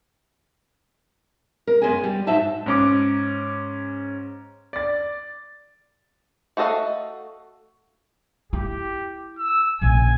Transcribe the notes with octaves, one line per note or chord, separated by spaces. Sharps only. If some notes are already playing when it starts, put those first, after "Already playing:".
A#4
F#2 E3 G#3 B3 G#4 G#5
G3
G#2 F#3 D#4 C5 E5 A5
G#2 C#4 D6
D5 A6
A3 F#4 A4 D#5 F5
E4 G4
E6
A#1 C#3 G#5